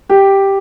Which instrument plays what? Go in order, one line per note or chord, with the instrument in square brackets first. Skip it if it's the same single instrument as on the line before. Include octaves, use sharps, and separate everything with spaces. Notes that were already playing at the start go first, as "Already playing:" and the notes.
[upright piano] G4